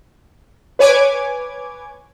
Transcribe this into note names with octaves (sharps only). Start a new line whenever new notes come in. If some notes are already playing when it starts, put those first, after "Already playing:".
B4 C#5 G#5 D6 G#6